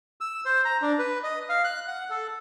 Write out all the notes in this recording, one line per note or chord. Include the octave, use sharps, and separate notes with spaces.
E6
C5
A#5
D4
B4
D#5
F5
F#6
F#5
A4